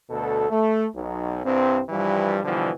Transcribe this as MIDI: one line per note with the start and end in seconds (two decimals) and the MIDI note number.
0.10 0.46 38
0.10 0.46 47
0.10 0.46 69
0.49 0.86 57
0.95 1.39 35
1.44 1.80 36
1.44 1.80 43
1.44 1.80 60
1.89 2.40 43
1.89 2.40 52
1.89 2.40 53
1.89 2.40 55
2.44 2.70 47
2.44 2.70 50
2.44 2.70 52
2.44 2.70 53
2.44 2.70 55